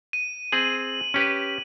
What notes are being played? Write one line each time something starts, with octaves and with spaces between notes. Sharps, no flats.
D#7
C4 G#4 F#7
C#4 G4 B4